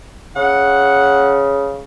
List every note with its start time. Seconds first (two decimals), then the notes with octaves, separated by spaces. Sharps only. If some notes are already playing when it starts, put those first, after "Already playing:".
0.36 C#3 F#5